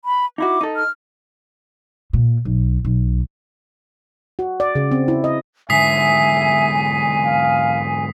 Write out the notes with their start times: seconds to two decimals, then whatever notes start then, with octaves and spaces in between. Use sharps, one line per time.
0.05 B5
0.38 D#4 E4 F#4 D6
0.61 D#4 A4
0.76 F6
2.13 A#2
2.45 B1
2.85 B1
4.39 F#4
4.60 D5
4.75 C#3
4.91 C4
5.08 E4
5.24 D#5
5.70 G#2 D3 E5 G#5 D#6 B6 C7
7.24 F5